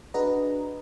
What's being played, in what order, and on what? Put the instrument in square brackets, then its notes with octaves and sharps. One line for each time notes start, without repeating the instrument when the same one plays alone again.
[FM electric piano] D4 F#4 G#4 B4 D#5 A#5